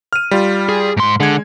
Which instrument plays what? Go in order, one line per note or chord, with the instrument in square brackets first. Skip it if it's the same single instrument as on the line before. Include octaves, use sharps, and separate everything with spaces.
[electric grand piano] F6 D#7
G3 F4
[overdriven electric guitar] G#4
G#2 C6
[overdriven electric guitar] D3 [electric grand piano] G#3 G#6